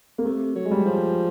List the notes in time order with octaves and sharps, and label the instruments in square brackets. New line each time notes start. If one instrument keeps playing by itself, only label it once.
[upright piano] A#3
[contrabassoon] C3 [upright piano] A3
[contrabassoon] F#3
[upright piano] G#3
G3
[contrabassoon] F3